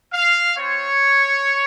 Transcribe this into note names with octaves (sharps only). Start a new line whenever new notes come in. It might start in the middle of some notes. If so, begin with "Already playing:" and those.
F5
C4 F4 C#5